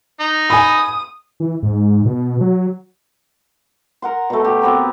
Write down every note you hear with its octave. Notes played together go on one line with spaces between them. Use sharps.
D#4
G#5 B5 D#6
E3
G#2
B2
F#3
A#4 F#5 C6
B2 A3
G4
B3 C4 G4 A#4